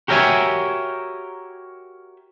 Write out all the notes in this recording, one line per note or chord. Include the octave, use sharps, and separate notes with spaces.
F#4 G4 A#4 C#5 E5 G#5